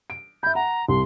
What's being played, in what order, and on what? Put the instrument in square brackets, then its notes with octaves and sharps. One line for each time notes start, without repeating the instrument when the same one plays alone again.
[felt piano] D7
[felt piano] E5 B5 [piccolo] G6
[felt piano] F#5 [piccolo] A#5
[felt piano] C2 [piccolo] C6